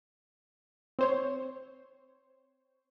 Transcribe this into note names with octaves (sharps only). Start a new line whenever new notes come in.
C4 C5 C#5